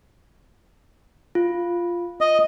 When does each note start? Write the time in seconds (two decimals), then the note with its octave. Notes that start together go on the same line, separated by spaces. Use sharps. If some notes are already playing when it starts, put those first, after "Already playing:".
1.35 F4
2.21 D#5